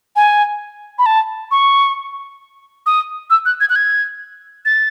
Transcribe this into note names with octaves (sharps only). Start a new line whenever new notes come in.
G#5
B5
A5
C#6
D#6
E6
F#6
G#6
F#6
G#6
A6